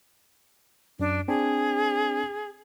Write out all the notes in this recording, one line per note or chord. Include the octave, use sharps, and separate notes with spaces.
F#2 D4
C4 D4 G#4